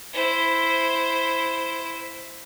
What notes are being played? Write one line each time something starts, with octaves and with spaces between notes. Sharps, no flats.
E4 C5